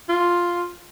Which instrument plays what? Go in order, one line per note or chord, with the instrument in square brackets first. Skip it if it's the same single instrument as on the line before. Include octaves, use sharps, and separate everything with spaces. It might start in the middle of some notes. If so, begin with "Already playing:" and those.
[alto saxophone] F4